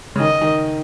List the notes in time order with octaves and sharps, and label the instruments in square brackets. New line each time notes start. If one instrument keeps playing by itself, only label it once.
[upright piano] C#3
[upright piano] D#3 [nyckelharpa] D#5
[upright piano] D#3